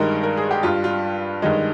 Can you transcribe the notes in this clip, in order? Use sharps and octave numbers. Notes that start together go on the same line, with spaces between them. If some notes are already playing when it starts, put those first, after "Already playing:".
Already playing: G2 D#3 G#3 A#4
A#4
G#4
G4
G2 G3 F4
F4
G2 D#3 G#3 D#4